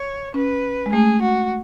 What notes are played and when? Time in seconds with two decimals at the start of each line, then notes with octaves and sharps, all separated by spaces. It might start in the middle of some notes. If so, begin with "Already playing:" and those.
Already playing: C#5
0.34 C#4 B4
0.86 G#3
0.93 A3 G#4
1.22 F#4